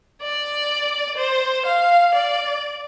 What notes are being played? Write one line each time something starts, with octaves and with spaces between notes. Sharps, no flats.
D5
C5
F5
D5